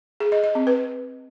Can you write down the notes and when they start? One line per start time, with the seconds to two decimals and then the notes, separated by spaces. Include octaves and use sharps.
0.20 G#4
0.32 D#5
0.44 D#5
0.55 C4
0.67 B4